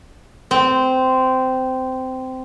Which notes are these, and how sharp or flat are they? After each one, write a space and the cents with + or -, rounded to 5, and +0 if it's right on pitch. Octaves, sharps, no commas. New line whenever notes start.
C4 -15